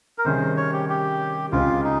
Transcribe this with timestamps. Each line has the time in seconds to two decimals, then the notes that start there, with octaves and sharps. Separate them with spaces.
0.18 A#4
0.25 C3 D#3 G3 C#4 G#4 C5
0.57 C#5
0.73 G4
0.89 G4
1.52 C#2 C#3 G#3 C4 F4
1.84 D#4